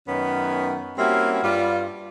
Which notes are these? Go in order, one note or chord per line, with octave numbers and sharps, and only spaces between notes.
F#2 D#3 B3 C#4
G3 A#3 C4 C#4 E4 F#4
G2 G3 F4